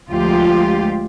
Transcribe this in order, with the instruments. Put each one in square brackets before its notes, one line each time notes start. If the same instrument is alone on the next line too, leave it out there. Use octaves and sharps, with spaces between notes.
[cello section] D2 F3 G#3 F4 G4